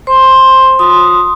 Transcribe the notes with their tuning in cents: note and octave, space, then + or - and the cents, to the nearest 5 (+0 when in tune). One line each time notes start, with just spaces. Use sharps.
C5 +10 C6 +10
F4 +35 C6 +0 D#6 +0